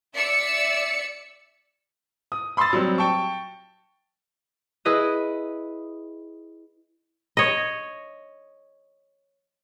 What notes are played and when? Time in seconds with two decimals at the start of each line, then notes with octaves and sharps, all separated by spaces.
0.14 D5 E5 E6 C#7
2.32 D#6
2.57 B5 C6 D#6 E6 A6
2.73 F#3 G3 C4
2.98 G5 A5 C#6
4.85 E4 G#4 B4 D#5 D#6
7.37 C#5 D#5